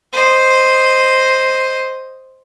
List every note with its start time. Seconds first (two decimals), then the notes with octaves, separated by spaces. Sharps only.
0.12 C5 D#5